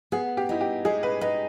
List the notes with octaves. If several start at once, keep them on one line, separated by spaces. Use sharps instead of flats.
B3 G#4
G4
D#4 E4
G4
G#3 G#4
B4
D#4 B4